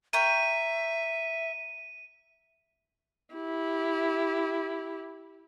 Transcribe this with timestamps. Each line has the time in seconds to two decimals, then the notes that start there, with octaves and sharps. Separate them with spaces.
0.13 A#4 C#5 E5 G5 D#7
3.34 E4 G4